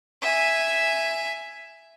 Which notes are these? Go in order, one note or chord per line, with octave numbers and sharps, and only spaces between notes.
E5 G#5